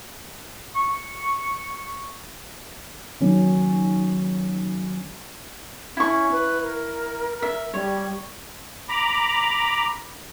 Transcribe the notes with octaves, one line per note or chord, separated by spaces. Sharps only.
C#6
D#3 F#3 C#4
C#4 E4 C#6
B4
A#4
E5
G3 C#5
A#5 B5 D6